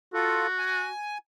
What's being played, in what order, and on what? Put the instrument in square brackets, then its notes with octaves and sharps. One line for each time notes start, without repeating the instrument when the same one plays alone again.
[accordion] F4 A4 [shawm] F#4
[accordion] G#5